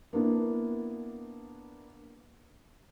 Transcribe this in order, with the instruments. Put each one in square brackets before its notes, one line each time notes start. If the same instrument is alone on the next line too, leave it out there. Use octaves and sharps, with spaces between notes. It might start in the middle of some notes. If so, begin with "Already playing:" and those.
[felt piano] A#3 B3 D4 E4